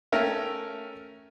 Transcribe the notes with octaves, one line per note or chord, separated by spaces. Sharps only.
A3 C#4 A#4 E5 G5